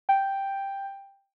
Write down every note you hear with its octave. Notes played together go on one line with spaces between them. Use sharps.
G5